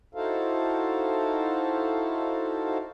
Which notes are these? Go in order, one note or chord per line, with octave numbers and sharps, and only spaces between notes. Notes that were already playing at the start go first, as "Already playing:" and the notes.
D#4 E4 F#4 A4 C5 F5